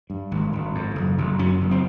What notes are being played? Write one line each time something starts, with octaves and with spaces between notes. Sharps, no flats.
G2
G#1
G#1
F2
F#1
F#1
F#2 C#4
F#1
C4